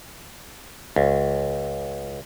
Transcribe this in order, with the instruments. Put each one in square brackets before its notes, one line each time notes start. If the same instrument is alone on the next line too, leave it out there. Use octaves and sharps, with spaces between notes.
[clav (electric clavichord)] C#2